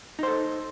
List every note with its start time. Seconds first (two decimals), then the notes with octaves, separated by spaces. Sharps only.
0.19 D#4
0.23 C5
0.27 A4